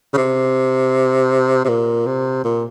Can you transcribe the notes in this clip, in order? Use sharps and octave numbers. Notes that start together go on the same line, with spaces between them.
C#3
C3
C3
A#2
C3
A#2